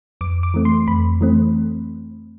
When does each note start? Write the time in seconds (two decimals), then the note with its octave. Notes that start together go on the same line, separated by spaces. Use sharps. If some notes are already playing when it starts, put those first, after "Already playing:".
0.21 F2 D6
0.43 D6
0.54 E3 A3 C4
0.65 C6
0.88 F2 B5
1.21 E3 A3 C4